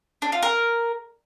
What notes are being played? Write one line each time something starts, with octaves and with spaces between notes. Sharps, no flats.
D4
F4
A#4